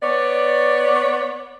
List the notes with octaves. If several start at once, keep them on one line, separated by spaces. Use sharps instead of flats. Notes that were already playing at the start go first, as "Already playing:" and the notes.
B3 C#5 D5